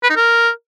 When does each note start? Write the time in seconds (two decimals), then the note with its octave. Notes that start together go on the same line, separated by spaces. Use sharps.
0.03 B4
0.10 D#4
0.16 A#4